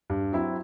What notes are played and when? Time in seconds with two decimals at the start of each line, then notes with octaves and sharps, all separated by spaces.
0.10 G2
0.33 F#3 C4 E4